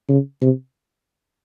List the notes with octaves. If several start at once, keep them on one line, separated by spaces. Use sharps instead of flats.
C#3
C3